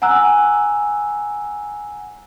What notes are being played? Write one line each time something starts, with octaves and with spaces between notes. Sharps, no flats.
F#5 G#5 A#5 E6 F#6